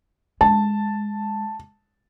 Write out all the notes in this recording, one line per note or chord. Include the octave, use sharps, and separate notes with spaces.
G#3 A5